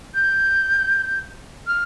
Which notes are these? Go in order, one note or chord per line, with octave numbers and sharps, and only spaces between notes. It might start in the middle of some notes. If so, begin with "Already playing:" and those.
G6
F6